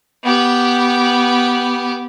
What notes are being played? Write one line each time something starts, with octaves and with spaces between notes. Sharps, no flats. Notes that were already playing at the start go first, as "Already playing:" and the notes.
B3 G4